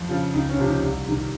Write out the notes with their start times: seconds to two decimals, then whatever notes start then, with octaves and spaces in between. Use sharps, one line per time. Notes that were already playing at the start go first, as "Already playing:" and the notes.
Already playing: F2
0.09 C#3 F3
0.34 C#2 D#4
0.49 C#4
0.58 C3 F3
0.66 D#4
0.82 C2
1.06 C3 D#3